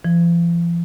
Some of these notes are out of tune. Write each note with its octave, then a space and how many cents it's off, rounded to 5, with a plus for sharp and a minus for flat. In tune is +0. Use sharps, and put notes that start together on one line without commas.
F3 -45